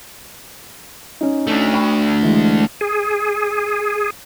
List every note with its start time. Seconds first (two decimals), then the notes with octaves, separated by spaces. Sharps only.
1.21 C#4 D#4
1.47 A3 D4
1.74 G5 B5 C#6
2.23 E3 G#3
2.81 G#4